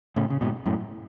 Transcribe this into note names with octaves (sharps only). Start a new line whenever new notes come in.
A2 C#3
C#3
G#2 B2
F#2 A2